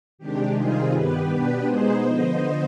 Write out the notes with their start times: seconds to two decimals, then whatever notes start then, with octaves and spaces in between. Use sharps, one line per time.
0.18 C3 D#3 G#3 D4 G4
0.55 C3 D#3 G3 C4 D#4 F4 G#4
0.92 G2 D#3 B3 G4 B4
1.29 B2 B3 D4 G4 B4
1.65 B2 G#3 B3 D#4 G#4 C5
2.02 D3 F3 B3 C5 D#5